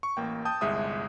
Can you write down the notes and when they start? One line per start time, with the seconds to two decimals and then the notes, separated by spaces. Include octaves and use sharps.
0.03 C#6
0.17 A1 A#3 G5
0.45 G5 A5 D#6 G6
0.61 G1 C2 G#3 E5 D#6